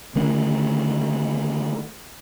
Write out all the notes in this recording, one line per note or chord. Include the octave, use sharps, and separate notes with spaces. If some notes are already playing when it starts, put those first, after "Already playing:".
D3 D#3 A3 C#4